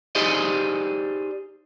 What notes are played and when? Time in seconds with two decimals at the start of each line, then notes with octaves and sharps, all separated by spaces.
0.15 D#4 G4 G#4 C5 D5 D#5